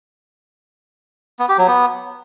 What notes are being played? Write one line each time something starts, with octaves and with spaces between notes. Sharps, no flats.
B3
G4
F#3
B3